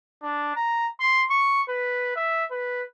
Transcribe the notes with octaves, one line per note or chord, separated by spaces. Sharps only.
D4
A#5
C6
C#6
B4
E5
B4